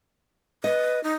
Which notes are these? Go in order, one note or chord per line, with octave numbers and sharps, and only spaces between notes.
B4 D#5
D#4